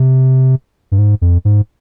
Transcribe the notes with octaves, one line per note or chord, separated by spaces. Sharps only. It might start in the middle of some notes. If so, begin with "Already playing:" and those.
Already playing: C3
G2
G#2
F2
G#2